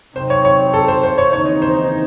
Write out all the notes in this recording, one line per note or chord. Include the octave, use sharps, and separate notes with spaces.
C3 F#3 C4 D#4 C5
C#5
C#5
A4
C5
C5
C#5
D#2 C#3 E3 C4 D#4 C#5
C5